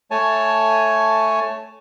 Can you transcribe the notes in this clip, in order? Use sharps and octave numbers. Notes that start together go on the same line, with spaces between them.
A3 C#5 G#5 A5